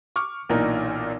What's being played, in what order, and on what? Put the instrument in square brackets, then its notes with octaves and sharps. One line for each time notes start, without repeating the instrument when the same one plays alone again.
[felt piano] C#6 D6 F6
B1 A#2 E3 D4 D#4 A#4